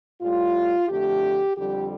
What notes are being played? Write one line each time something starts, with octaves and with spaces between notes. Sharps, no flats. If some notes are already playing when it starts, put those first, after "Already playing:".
A2 G3 F4
F2 D3 A3 G4
F2 D3 G3 G4